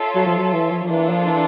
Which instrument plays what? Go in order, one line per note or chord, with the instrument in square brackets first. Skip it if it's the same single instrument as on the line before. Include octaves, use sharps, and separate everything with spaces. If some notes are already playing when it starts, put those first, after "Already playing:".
Already playing: [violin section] F4 A4 C#5 E5
[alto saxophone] F#3
F3
F#3
E3
F3
F3
[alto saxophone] E3 [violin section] A#3 D4 F4 A4
[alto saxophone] F3
E3